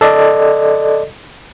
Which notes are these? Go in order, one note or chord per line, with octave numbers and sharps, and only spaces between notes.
A4 D5 D#5